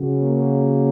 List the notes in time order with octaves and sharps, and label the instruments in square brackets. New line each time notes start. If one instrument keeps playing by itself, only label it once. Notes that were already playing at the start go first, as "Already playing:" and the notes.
Already playing: [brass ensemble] C#3 F#3
A#3